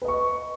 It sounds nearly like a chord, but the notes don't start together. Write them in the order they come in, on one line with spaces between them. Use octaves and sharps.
B4 D#5 C#6